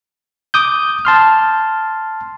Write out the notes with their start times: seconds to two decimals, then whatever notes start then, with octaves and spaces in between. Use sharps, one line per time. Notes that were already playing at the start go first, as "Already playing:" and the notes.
0.54 D6 D#6 G6
1.05 A5 C6 F6